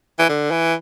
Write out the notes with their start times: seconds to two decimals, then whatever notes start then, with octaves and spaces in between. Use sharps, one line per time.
0.19 E3
0.29 D3
0.51 E3